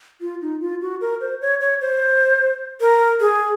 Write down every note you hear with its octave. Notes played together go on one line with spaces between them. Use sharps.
F4
D#4
F4
F#4
A#4
C5
C#5
C#5
C5
A#4
G#4